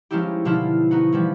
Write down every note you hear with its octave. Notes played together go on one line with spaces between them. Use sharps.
F3 G#3 C#4 D#4 E4 G4
B2 D3 F3 E4 F4
B3 D#4 F#4
E3 F3 G3